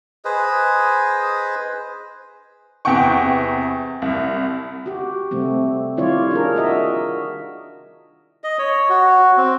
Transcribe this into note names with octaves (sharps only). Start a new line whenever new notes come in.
G#4 B4 C5 D#5
E2 C3 F#5 G5 C#6
C2
F#4 G4
C3 G3 A3 C4
D#3 G3 E4 F4 C#5 D5
D4 G#4 A#4
F4 F#4 D#5 E5
D#5
C#5
F#4
C4